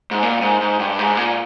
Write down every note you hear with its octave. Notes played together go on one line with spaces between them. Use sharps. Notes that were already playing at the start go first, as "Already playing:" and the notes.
G#2
A#2
G#2
G#2
G2
G#2
A#2